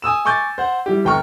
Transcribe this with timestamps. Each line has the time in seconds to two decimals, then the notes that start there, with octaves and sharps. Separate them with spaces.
0.02 G#5 D#6 E6 E7
0.25 G#5 C#6 D6 G6 A6
0.58 C5 F#5
0.86 G3 E4 G4
1.05 G1 G5 A#5 C#6 F6